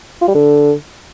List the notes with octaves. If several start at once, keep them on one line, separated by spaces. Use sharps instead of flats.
F4
G3
D3